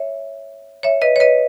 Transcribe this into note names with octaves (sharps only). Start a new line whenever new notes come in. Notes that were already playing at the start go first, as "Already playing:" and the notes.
Already playing: C#5 E5
C#5 E5
B4 D#5
C#5
B4 D#5